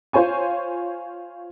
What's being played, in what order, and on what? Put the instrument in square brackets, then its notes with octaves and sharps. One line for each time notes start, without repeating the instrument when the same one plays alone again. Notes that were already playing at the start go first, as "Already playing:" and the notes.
[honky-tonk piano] F4 C5 C#5 G#5 C#6